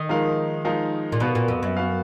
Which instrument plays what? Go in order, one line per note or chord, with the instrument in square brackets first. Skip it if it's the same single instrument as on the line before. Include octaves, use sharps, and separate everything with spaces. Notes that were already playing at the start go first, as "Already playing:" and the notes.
Already playing: [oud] D#3
[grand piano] F3 G#3 D#4 A#4 F5
F3 G#3 D#4 A#4 F5
[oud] A#2
[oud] B2 [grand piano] B3 F#4 B4 F5
[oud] A#2
F2
F#2
[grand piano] B3 F#4 B4 F5